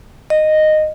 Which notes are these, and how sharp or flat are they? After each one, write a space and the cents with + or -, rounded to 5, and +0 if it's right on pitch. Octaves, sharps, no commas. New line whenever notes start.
D#5 -10